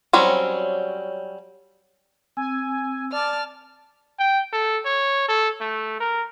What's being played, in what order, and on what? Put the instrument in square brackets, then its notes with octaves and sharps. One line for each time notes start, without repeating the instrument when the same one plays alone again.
[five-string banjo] F#3 G3 C4 C#4
[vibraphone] C4 E6 [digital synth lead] G#5
[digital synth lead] D5 [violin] A5 F6
[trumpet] G5
A4
C#5
A4
A3
A#4